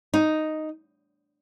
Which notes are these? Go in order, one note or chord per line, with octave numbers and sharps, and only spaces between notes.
D#4